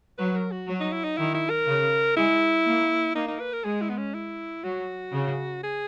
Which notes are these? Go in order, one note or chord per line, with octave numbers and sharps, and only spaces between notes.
F#3 B4
A#4
F#4
F#3
D#4
E4
D#4
D#3 E4
E4
A#4
C#3
G#3 E4
A#3
A#3 D#4
D#4
B4
A#4
G#3 G#4
E4
B3
C#4
E4
F#3 F#4
C#3
G#4